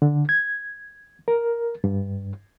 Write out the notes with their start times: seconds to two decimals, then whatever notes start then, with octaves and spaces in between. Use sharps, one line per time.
0.02 D3
0.29 G#6
1.28 A#4
1.84 G2